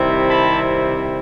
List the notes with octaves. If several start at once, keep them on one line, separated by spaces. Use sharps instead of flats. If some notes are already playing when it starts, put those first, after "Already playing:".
Already playing: C3 D#3 G3 C4 E4
A5 B5